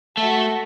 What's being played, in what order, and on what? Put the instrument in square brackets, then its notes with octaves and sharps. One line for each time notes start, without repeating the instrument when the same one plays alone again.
[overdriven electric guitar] A3 [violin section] F#4 A4 E5